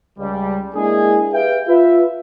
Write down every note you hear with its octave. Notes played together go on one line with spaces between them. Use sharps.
C#2 G3
G#3 A#3 D4 E4 G#4
G4 G#4 B4 E5 F5 G5
F4 B4 E5